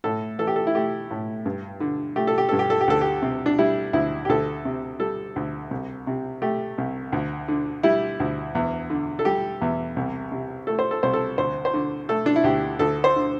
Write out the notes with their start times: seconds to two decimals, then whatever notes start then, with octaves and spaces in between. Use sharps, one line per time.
0.04 A2 A4
0.39 E3 A4
0.47 G4
0.56 A4
0.67 E4
0.75 A3 G4
1.11 A2
1.46 G2
1.80 D3
2.16 A3 G4
2.27 A4
2.38 G4
2.49 G2 A4
2.59 G4
2.70 A4
2.81 G4
2.88 D2 A4
3.01 G4
3.22 C3
3.46 D4
3.59 G3 E4
3.93 D2 E4
4.25 G4
4.29 D2 A4
4.65 C3
5.00 G3 A4
5.36 D2
5.71 C2
6.07 C3
6.42 A3 G4
6.78 C2
7.12 D2
7.48 D3
7.83 G3 E4
8.20 D2
8.55 E2
8.90 D3
9.19 A4
9.25 G3 G4
9.62 E2
9.96 C2
10.32 C3
10.67 A3 A4
10.79 C5
10.91 A4
11.03 C2 C5
11.13 A4
11.38 D2 C5
11.65 C5
11.73 D3
12.09 A3 A4
12.26 D4
12.36 E4
12.44 D2 G4
12.79 D2 A4
13.04 C5
13.16 D3